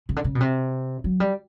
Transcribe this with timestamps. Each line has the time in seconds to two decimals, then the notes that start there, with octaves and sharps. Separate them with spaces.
0.09 C#3
0.16 D3
0.24 C#3
0.35 B2
0.40 C3
1.04 F#3
1.20 G3